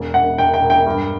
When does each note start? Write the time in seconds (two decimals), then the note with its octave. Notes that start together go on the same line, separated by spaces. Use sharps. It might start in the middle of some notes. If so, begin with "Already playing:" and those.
Already playing: E1
0.14 E1 F#5
0.38 E1 G5
0.54 G5
0.61 E1
0.70 G5
0.86 G2